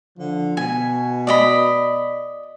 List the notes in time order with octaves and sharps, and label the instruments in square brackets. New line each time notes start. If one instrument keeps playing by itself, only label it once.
[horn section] D3 F3
[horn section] B2 [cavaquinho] G#5
[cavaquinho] D5 D#5 B5